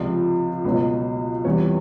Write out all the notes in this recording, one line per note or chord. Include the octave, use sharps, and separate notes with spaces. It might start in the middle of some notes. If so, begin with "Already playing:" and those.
Already playing: C#2 C3 F3 D5
C#2 B2 F#3
E2 C3 E3 G3 C#5